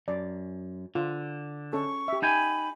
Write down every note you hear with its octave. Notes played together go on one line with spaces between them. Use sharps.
F#2 D5
D3 F4
C#4 A4 C#6
G4 E5
D#4 G5 G#5 B5